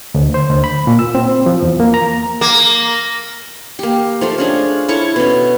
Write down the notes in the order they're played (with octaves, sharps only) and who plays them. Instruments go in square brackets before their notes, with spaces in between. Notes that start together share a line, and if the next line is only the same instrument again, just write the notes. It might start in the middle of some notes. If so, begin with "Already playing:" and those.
[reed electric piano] D2
C5
D2
B5
A#2
E6
C4
F3
E2
A#3
A#5
[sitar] A#3
[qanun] A#3 G4
F3 A3 F4
C#4 D4 G#4
E4 A4 C#5 C#6
B2 C#4